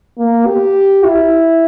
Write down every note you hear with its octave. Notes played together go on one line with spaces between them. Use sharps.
A#3
G4
E4